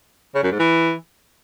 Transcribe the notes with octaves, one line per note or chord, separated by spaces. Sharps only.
C#3
F#2
G#2
E3